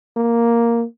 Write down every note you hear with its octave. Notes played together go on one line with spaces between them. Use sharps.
A#3